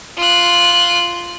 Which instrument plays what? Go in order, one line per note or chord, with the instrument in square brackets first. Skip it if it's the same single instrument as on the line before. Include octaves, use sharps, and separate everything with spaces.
[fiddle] F4 F#6